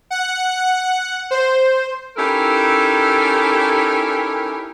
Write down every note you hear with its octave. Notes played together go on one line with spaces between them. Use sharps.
F#5
C5
C#4 D#4 E4 G4 A4 A#4